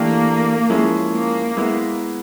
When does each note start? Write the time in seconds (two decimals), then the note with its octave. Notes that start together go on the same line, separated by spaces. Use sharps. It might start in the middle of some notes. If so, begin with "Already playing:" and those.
Already playing: E3 A3 A#3 D4 G4
0.69 F3 G#3 C#4 E4 G#4
1.13 A#3
1.57 G#3 B3 E4